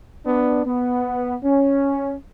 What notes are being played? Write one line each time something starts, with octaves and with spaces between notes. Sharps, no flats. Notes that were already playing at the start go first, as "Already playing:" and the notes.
B3 D4
B3
C#4